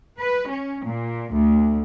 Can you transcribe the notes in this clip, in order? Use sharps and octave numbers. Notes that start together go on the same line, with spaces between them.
B4
C#4
A#2
D2